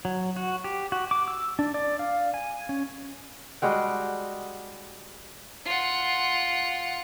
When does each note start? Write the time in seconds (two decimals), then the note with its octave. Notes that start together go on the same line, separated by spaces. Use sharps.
0.05 F#3
0.36 F#4
0.64 G4
0.92 F#4
1.11 D6
1.28 E6
1.59 D4
1.74 D5
1.99 F5
2.34 G#5
2.69 C#4
3.62 G3 G#3 F#4 G5
5.66 F4 F#5